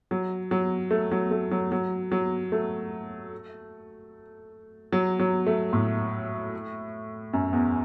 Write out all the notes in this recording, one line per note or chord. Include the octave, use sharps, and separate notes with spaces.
F#3
F#3
A3
F#3
A3
F#3
F#3
F#3
A3
F#3
F#3
A3
A2
F#2
E2